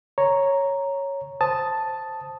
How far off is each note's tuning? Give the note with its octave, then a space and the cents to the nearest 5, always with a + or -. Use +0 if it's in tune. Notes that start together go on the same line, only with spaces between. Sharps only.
C#5 +0 A#5 +0
C5 +0 A5 +0 D#6 +0